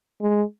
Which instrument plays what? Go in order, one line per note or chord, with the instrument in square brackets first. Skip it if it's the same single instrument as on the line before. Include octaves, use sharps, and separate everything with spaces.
[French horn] G#3